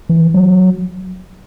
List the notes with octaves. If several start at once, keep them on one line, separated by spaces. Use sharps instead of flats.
E3
F#3